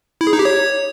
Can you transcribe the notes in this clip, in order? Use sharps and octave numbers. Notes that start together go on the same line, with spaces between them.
E4
G#4
D#4
G4
C#5